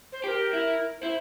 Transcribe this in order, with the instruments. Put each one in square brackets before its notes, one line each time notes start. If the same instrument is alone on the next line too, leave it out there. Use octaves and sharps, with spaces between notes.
[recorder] C5
[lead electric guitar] G4 [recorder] A#4 C5
[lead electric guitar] E4
[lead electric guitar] E4 [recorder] C5